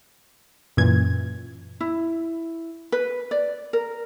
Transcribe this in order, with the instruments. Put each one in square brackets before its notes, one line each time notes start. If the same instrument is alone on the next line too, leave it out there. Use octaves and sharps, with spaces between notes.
[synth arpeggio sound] F#2 A#2 E3 G#6
[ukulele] E4
B4
D5
A#4